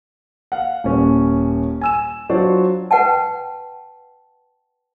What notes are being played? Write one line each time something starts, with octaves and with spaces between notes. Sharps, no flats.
F5 F#5
D#1 C#4
G#5 E6 E7
F#3 D4 F4 F#4 C5 D5
B4 F#5 G5 A5